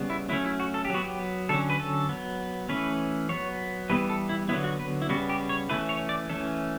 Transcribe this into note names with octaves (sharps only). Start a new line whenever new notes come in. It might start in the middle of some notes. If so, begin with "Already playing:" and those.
Already playing: C#3 G3 B3
E4
F#3 A3 C#4 E4
E4
F#4
A4
G4
F#3 B3 F#4
G4
D3 F#3 C#4 A4
B4
A4
F#3 B3
E3 A3 C#4 B4
F#3 B3 C#5
E3 G3 B3 B4
A4
E4
D3 F#3 B3 E4
F#4
B4
E4
C#3 G3 B3 F#4
G4
C#5
E3 A3 C#4 B4
C#5
D5
E3 A3 C#4 A4